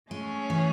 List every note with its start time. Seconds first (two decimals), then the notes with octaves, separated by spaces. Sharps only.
0.11 G#3 A3 C#4 G#4
0.50 E3